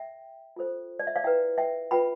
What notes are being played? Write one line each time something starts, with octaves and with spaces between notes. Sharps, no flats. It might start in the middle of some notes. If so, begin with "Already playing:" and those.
Already playing: E5 G5
F4 A4 C5
D5
E5
D5 F5
E4 B4 E5 G5
E5 G5
F4 B4 G5 B5